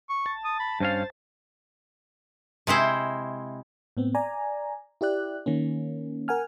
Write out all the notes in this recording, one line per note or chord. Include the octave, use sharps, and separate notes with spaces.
C#6
A5
D#6
B5
G2 C#4 C5 F5
C3 G#3 E4 C5
A2 B3 C4
D5 G#5 A#5
E4 G4 D5 F#6
D#3 A#3 C#4
A#4 F#5 G#5 F6